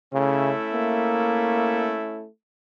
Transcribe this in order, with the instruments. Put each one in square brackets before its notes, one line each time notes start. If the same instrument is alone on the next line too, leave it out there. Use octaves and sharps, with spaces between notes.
[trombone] C#3 [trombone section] A3 C#4 E4
[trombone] A#3